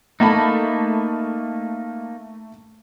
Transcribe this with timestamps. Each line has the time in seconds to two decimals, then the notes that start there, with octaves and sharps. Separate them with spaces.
0.20 A3 A#3 D#4 A5 B5